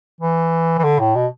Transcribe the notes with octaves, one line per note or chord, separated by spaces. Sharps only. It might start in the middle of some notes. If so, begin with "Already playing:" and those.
E3
E3
D3
A2
B2